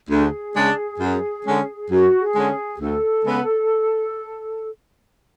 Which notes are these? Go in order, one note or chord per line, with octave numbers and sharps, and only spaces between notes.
D2 G#4
C#3 G#3 D4
F#2
D3 G#3 C#4
F#2 F#4
G#4
D3 G#3 C#4
G#4
D2 A4
C#3 G#3 B3